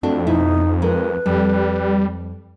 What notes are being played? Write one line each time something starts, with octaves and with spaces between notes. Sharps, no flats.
F2 A3 C4 D4 F#4
B2 D#4 E4
G#3 A#4 B4
F2 G3